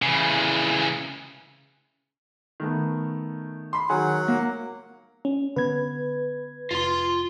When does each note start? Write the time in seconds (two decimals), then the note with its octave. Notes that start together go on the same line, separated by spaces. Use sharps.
0.02 C#3 E3
2.60 D#3 A3 B3
3.73 B5 C6
3.89 D#3 F#3 G#4 F#5
4.28 A#3
5.25 C#4
5.56 D3 B3 B4 G#6
6.71 F1 F4 C6